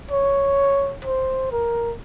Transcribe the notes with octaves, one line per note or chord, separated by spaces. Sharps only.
C#5
C5
A#4